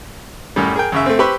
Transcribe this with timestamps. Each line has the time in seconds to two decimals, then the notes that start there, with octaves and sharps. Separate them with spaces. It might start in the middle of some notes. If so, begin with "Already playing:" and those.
0.56 F#2 A2 G3
0.76 G#4 A#4 G5
0.92 F#2 C#3 E5
1.06 A3 C4
1.19 G4 B4 C5 B5 C#6 E6